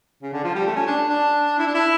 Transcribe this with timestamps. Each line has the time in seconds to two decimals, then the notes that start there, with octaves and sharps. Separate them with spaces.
0.22 C#3
0.33 D3
0.44 F3
0.55 G3
0.66 A3
0.76 C#4
0.87 D4
1.09 D4
1.59 E4
1.67 D4
1.75 E4